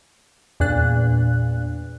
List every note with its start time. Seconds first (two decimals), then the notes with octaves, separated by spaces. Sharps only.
0.60 E2 A#2 D4 F#6